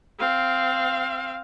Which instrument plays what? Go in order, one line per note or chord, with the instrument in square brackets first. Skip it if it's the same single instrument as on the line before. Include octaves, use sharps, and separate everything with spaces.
[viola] C4 F5